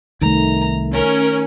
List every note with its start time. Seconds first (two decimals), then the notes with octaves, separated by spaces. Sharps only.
0.22 C2 D#3 A3 A#5
0.93 C#4 A#4